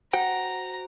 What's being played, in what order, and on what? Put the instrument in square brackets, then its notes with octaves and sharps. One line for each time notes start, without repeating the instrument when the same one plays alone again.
[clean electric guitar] F#4 C5 G5 [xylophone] F#5 [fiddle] A#5